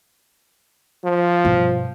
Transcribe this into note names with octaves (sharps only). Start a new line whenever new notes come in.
F3
G2 B2